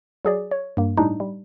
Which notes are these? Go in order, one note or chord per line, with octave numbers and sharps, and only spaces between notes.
F#3 G#4 D5
C#5
G2 A#3
A2 G3 D4 D#4
G3